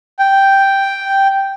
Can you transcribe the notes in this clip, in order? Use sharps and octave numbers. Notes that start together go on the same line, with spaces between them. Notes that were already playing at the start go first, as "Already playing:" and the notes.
G5